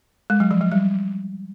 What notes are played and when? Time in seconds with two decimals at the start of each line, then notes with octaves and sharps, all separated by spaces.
0.30 G#3
0.40 F#3
0.51 F3
0.61 F#3
0.72 G3